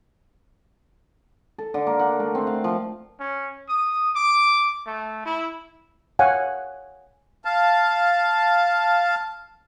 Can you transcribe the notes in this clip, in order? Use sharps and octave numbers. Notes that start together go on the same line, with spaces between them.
A4
D3
A#3
F#5
A3
C4
F5
F3
C#4
D#6
D6
A3
E4
C#5 F5 F#5 G#5
F5 A5